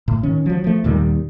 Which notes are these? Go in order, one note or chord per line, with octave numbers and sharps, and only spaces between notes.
A2
D#3 C#4
F3 F#3
F3 A3
D#2 A#2 D#3 G3